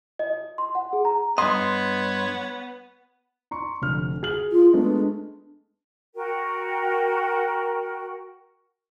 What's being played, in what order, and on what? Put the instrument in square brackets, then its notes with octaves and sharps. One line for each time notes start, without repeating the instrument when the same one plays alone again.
[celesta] D#5
D#5
C6
F#5
G#4
A#5
[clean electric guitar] G2 D#5 [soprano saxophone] B3 [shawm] C#5 [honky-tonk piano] C6
[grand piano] A#5 C6 C#6
F1 D3 F6
G#4 F6 F#7
[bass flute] F4
[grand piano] G#3 A3 B3 [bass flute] D4
[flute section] F#4 A#4 G5